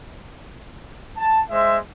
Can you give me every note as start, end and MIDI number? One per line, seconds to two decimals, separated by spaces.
1.17 1.40 81
1.50 1.77 56
1.50 1.77 72
1.50 1.77 76